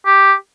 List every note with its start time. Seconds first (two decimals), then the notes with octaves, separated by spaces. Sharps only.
0.06 G4